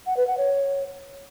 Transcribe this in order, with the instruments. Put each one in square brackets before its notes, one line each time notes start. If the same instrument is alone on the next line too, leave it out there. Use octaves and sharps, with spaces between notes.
[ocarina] F#5
B4
F#5
C#5